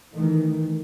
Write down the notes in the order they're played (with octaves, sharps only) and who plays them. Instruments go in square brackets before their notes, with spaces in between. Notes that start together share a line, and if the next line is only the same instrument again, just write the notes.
[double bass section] D#3 E3 A3